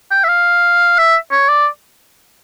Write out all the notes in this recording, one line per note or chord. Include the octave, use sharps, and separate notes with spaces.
G5
E5
F5
E5
C#5
D5